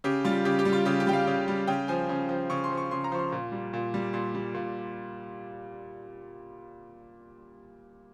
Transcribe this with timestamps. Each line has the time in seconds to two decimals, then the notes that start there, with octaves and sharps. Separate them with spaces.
0.04 C#3 G4
0.25 G3 F4
0.45 C#3 G4
0.59 G4
0.65 G3
0.73 F4
0.85 C#3 G4
1.00 G4
1.07 G3 G5
1.13 F5
1.27 C#3
1.48 G3
1.67 C#3 G5
1.88 F3 G#5
2.09 C#3
2.29 F3
2.50 C#3 C#6
2.64 C6
2.70 F3
2.77 C#6
2.91 C#3 C6
3.04 A#5
3.12 F3 C#6
3.19 C6
3.32 A#2
3.52 G3
3.73 A#2
3.94 G3
4.13 A#2 C6
4.34 G3
4.54 A#2